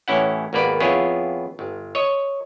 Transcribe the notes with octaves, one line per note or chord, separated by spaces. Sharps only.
A1 C#4 E4 F#5
G#1 D#2 A#3 B3 B4 D5
F2 B3 E4 F4 G#4 C#5
G1
C#5 D#5